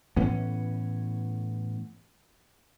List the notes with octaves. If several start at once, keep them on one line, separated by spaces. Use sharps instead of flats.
A2 E3 B3 C#4